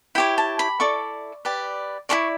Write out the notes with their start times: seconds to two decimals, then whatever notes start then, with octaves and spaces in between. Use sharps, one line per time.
0.15 E4 G4 C#5 G5
0.38 A5
0.59 B5
0.80 E4 A4 D5 C#6
1.45 G4 B4 D5
2.09 E4 A4 D5 C#6